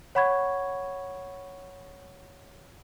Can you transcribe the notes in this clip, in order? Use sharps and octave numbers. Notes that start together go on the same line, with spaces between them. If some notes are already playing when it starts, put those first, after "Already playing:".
C#5 F#5 B5 C#6 G#6